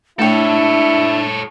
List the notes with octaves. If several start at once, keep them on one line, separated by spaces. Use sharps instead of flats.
A3 D4 E4 A4 C#5 G5